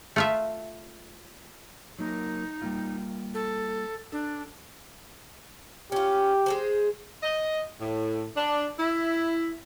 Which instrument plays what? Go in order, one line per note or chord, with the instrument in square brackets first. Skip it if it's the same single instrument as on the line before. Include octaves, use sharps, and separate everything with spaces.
[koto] A3 F4 E5
[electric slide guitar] F#3 A#3 A#4 [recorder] D#4
[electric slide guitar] G3 A#3 F4
[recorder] A4
[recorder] D4 [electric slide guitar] A4
[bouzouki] C#4 F4 [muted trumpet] G4
[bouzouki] G#3 G#4 C5
[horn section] D#5
A2
D4
E4